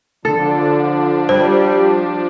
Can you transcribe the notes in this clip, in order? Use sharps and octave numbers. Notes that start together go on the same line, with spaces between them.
D3 F3 D4 A4
G3 C5